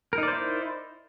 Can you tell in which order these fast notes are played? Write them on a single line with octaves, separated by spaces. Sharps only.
A#4 D#4 D5 C5 E4